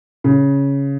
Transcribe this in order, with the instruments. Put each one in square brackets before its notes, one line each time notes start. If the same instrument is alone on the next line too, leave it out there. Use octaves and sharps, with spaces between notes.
[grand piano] C#3